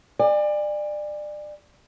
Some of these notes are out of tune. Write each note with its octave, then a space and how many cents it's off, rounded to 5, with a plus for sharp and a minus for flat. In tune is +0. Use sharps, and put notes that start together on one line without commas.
D5 +25 G#5 -35